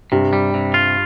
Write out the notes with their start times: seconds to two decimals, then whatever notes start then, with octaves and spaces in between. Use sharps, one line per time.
0.12 G2 C3
0.33 G3
0.54 C3
0.74 F4